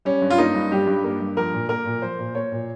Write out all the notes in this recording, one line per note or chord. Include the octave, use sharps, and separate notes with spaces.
G3 C#4
G2
F4
A#3 D#4
G2
G3 G4
G2
A#3
G2
F3 A#4
A#2
A#3 A#4
A#2
F3 C5
A#2
A#3 C#5
A#2